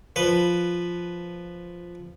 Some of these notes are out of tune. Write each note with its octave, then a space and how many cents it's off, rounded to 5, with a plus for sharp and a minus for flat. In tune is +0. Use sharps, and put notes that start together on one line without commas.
F3 +0 B4 +0